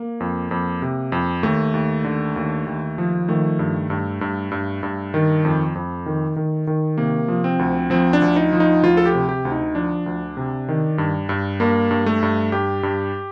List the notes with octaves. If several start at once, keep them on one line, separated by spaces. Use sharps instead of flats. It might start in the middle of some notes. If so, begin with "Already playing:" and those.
Already playing: A#3
F2
F2
C3
F2
D#2 A3
D#2
D3
D#2
D#2
F3
D#3 A3
G2
G2
G2
G2
G2
D#3
F2
F2
D#3
D#3
D#3
C3 A#3
F3
C4
D2
F3 C4
D4
D2
D#4
F3
D#4
D2 F4
A4
G4
C3
G4
D2
D#4
F3 D4
D2
C3
D#3
G2
G2
G2 A#3
G2
A3
G2
G2 G4
G2